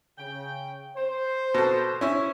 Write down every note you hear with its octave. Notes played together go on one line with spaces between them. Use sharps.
C#3 G5
C5
B2 A4
C#4 E4